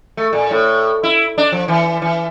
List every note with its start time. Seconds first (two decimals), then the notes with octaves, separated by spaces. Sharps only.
0.17 A3
0.33 A#2
0.51 A2
1.03 E4
1.38 D4
1.52 F3
1.68 E3
2.02 E3